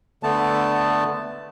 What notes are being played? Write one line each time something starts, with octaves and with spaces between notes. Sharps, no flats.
D3 A3 B3 A5